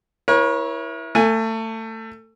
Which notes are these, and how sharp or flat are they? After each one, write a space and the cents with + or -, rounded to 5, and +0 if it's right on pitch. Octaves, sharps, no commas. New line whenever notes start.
E4 +0 A#4 +45 C#5 -15
A3 +25 G#5 +0